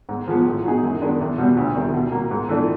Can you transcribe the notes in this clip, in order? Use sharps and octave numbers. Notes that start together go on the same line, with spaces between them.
G#2
F3 G#3 B3
A2
F#3 B3 D#4 G#4
F#2
D#3 G#3 B3 D4
E2
B2 G3 B3
D2
C3 D#3 G3
B2
F#3 A#3
G#2
E3 A3 D4